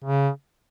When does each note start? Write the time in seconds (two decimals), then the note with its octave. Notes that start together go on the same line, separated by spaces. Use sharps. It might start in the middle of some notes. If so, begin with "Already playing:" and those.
0.04 C#3